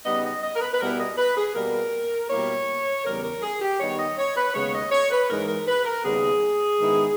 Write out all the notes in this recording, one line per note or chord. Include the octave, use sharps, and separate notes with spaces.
C#3 G3 B3 D#4 D#5
D#5
D#5
A#4
B4
B4
B2 G3 B3 E4 A#4
D#5
B4
G#4
B2 G3 A#3 A#4
B2 G3 A#3 E4 C#5
E2 C#3 G3 A#4
A#4
G#4
G4
D#3 G3 B3 D#4 C#5
D#5
C#5
B4
D#2 C#3 G#3 B3 C#5
D#5
C#5
B4
G#2 E3 G#3 D#4 A#4
A#4
B4
A#4
D#2 C#3 G3 B3 G#4
G#2 D#3 G#3 B3 E4